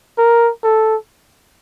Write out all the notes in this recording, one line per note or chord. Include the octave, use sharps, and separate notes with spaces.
A#4
A4